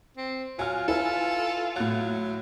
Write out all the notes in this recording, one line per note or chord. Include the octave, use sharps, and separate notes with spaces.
C4
F#3 F4 G#5 F6
E4 A4 B4 G#5
A2 F#3 F#6